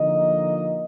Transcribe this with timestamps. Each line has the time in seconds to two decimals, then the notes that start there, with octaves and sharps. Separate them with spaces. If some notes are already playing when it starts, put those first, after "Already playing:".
Already playing: D3 F3 A#3 D#4 D#5